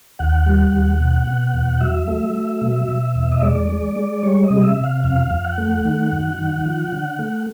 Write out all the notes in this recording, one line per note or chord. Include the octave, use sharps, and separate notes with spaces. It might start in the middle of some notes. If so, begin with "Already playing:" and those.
D#2 F#5
G3
D#2
B2
B2
E2
F#3 E5
A3
F#3
B2
B2
E2
D#5
G#3 D5
G#3
G#3
G3 C#5
D#5
C3
E5
C3
F5
F2 F5
F2
F#5
A3
D#3
F#2
D#3
F3
D3
A3